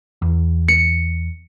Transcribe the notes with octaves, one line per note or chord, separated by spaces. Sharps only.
E2
C#7